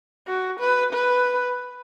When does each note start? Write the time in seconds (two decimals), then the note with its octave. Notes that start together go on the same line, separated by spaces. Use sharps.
0.27 F#4
0.60 B4
0.93 B4